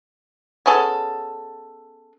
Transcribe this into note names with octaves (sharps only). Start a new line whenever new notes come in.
B3 C#4 G#4 A4